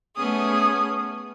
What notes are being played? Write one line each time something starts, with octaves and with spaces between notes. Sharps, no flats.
A3 B3 C#4 G#4 D#6